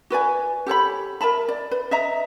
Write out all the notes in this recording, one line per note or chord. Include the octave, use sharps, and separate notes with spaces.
F#4 B4 D5 G#5
G4 A4 C#5 B5
A#4 E5 A5 B5
D5
B4
D#5 E5 A#5